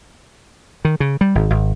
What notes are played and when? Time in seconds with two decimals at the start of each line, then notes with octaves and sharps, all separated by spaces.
0.85 D#3
1.00 C#3
1.21 G3
1.35 G#1
1.50 G#1